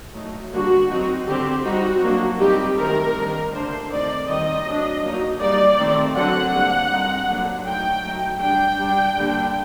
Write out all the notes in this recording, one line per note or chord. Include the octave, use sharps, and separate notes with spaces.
F#3 A3 D#4
D3 G3 A#3 F#4
F#3 C4 D#4
D3 G3 C4 G4
G3 C4 D#4 F#4
F#3 A#3 D4
G3 C4 D#4 G4
D#3 A3 C4 D#4 A#4
D#3 G3 A#3 D4
D3 A3 D4 C5
D#3 A3 C4 D#4 D5
D#3 G3 C4 D#4 D#5
F#3 A3 D4
F#3 A#3 D#4
G3 A#3 D#4 D5
D#3 A3 C4
D3 F#3 C4 F#5
D3 G3 A#3
G3 C4 D#4
D3 F#3 A#3 D4
F#3 A3 D#4 G5
F#3 A3 D#4
G3 D4 G5
G3 D4
D3 G3 A#3 D4